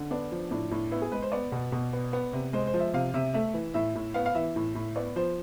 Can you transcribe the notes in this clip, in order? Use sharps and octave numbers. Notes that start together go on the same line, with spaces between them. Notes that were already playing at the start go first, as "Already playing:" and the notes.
Already playing: D3
B3 D4
F3
A2 D4
A2
B3 E4
G#4
G#3 B4
C5
B3 D5
B2
B2
B3
B3
C3
G#3 C5
C5
F3
E5
C3 F5
C3 E5
A3 E5
E3
A2 E5
A2
B3 F5
F5
E3 E5
A2
A2
B3 D5
F3 C5